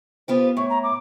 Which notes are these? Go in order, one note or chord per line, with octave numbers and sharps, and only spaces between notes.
B3 F4 G4 C5
A2 C#6
A#5
D6